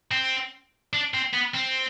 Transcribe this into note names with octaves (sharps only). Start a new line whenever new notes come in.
C4
D4
C4
B3
C4